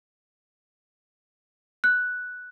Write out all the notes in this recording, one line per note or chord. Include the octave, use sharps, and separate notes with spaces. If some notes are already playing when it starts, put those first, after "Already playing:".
F#6